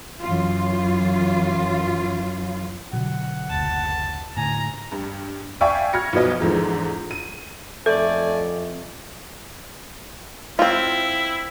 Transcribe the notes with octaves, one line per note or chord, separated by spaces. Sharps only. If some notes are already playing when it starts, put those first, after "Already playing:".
F#2 E3 F4
B2 D3 F#3 F#5
F#1 D2 A5
A2 D3 G#5 A#5
G2
D5 E5 F5 G5 G#5 C#6
F6 G#6 A#6 C#7
B1 B2 F3 B4 D#5
E2 G#2 D3 F3
D#7
F2 A3 A4 D5 G#5
C4 E4 F4